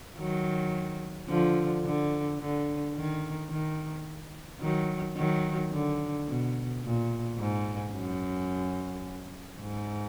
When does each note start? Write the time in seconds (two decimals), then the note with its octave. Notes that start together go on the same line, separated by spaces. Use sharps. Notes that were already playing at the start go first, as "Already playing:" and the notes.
0.18 D#3 F#3
1.29 D3 F3
1.85 D3
2.40 D3
2.95 D#3
3.50 D#3
4.61 D#3 F#3
5.17 D#3 F#3
5.72 D3
6.28 B2
6.84 A#2
7.39 G#2
7.94 F#2
9.60 G#2